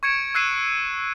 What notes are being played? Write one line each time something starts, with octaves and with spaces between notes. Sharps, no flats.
C#6 G#6 C#7 D7 E7
E6 F#6 G#6 C7 D#7 E7